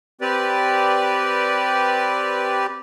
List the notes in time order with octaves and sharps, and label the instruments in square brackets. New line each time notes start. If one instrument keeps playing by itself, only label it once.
[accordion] C4 G4 B4 D5